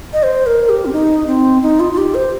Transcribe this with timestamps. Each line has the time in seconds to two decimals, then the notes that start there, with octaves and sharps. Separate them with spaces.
0.13 D#5
0.23 C5
0.46 A#4
0.69 G4
0.86 C4
0.93 D#4
1.27 C4
1.63 D#4
1.80 F4
1.93 F4
1.98 G4
2.15 C5